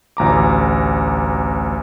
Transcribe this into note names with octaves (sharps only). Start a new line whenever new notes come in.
A1 D2 A#5 D6